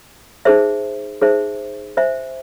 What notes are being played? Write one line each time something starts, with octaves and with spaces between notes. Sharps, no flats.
D#4 G#4 C5 E5
D#4 G#4 C5 E5
C5 E5 G#5